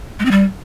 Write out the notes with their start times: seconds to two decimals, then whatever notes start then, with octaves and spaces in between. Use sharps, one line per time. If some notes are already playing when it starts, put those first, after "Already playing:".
0.20 G#3
0.25 C4
0.31 G3